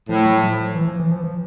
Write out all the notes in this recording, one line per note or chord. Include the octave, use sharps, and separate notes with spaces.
A2 F3
F#3
F#3
F3
E3
F3
E3
F3
F3